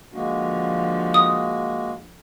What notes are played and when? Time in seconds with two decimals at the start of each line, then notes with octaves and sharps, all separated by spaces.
0.14 D3 F3 G#3 A#3 F#4
1.14 D#6